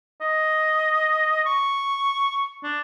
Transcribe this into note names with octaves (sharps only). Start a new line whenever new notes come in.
D#5
C#6
D4